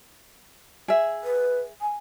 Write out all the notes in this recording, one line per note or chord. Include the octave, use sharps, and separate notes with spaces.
G#4 E5
B4
G#5